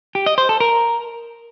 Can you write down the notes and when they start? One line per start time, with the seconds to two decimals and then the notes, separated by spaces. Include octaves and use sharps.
0.15 G4
0.26 D#5
0.38 C5
0.49 A4
0.60 A#4